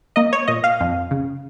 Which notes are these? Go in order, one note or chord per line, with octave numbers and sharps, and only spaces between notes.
A#3 D#5
C#5
A#2 D#5
F5
F2
C#3